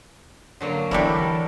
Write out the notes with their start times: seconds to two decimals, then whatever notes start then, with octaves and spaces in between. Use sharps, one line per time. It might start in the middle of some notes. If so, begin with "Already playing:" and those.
0.61 D3 F#3 A#3
0.91 E3 G3 D4 E4 A4 A#4